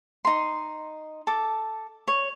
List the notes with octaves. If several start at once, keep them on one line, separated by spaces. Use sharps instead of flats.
D#4 C6
A4 D6
C#5